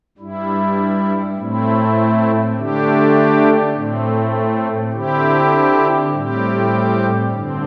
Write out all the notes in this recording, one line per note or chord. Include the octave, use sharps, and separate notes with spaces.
G2 G3 E4
A2 A3 C4 E4
D3 A3 D4 G4
A2 A3 C4
D3 C4 E4 G4
A2 G3 C4 G4
G2 D3 C4